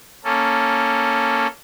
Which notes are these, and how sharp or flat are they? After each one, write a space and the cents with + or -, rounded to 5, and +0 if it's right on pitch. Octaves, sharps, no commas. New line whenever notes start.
A#3 +0 C#4 +0 A4 +0